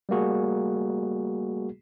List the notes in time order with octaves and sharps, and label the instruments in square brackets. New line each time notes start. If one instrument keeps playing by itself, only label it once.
[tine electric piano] G3 A3 A#3 F#4 G#4